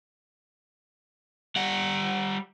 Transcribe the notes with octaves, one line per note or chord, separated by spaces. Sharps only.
G3 F#5